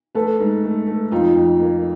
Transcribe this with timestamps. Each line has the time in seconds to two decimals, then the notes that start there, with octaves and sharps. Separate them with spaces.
0.15 A3 A4 B4
0.40 G#2
0.64 A3
0.87 A3
1.12 F2 D#4 F4
1.36 F2
1.60 A#3